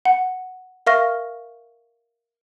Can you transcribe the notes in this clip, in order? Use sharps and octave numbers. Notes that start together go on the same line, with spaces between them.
F#5
A#4 E5 F5 C#6 F6 A#6